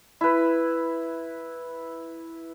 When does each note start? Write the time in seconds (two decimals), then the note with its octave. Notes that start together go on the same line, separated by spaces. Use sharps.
0.21 E4 B4